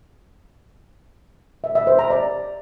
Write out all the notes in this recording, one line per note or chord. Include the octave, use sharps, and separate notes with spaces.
E5
E5
C5
A#5
D5